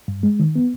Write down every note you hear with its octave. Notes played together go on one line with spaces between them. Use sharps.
G2
G#3
D#3
B3